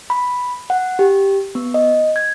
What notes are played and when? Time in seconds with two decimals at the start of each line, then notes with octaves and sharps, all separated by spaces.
0.10 B5
0.70 F#5
0.99 G4
1.55 B3
1.74 D#5
2.16 G#6